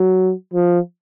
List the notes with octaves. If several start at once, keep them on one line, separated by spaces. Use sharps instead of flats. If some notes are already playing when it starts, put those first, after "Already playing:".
Already playing: F#3
F3